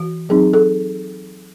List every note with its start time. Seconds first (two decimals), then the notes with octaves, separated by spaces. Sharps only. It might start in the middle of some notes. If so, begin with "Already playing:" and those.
Already playing: E3 F#4
0.29 F#3 C4 D#4 G#4
0.53 A4